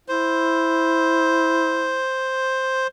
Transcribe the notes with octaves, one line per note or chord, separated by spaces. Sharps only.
E4 C5